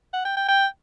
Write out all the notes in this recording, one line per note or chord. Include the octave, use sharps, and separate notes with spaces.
F#5
G5
G5
G5